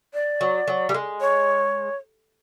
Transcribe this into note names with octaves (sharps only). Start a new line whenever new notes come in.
D5
F#3
F#3
G3
G#3
C#5